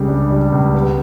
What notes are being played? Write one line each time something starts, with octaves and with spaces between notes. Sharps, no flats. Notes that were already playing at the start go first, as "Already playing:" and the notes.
Already playing: C#2 C#3 G3
D4
G3
C#2
B3